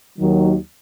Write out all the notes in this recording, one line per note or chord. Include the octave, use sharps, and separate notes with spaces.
D#2 D#3 F#3